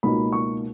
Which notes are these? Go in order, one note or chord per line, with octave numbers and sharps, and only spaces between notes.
C#2 B2 A#3 D#4 B5
C#6